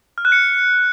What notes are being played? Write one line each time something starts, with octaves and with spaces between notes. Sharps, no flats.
F6
F#6
C#7